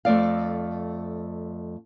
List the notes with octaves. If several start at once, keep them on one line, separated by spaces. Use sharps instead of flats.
F2 A3 D5 F5